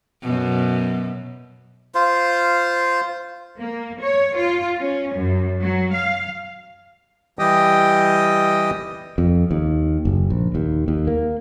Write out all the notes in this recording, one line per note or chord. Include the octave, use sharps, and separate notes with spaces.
F#2 B2
F4 C5
A#3
C#5
F4
C#4
F#2
F#3
F5
E3 G3 G4 D#5 G5 D#6
F2
D#2
F#1
A#1
D#2
D#2
A#3